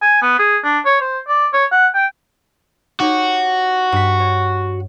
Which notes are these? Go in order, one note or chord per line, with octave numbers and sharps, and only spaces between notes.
G#5
B3
G#4
D4
C#5
C5
D5
C#5
F#5
G5
D#4 F#4 G4 C#5
G2 B6
C#5